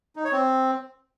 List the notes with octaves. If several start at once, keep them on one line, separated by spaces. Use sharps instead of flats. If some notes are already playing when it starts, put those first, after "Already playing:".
D#4
C#5
C4